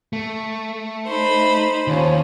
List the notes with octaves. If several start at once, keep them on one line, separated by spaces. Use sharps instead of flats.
A3
D#4 C5 B5
D#2 F3 C#4